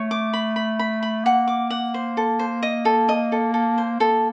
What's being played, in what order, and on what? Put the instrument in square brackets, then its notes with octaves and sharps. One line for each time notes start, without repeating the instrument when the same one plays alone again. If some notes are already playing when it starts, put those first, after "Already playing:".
Already playing: [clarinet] A3 [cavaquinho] C#5
[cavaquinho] D6
B5
B5
B5
B5
[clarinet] A#3 [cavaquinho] F#5
[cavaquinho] D6
F#5
C5
A4
C5
D#5
A4
D#5
A4
A4
C5
[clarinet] A#3 [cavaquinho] A4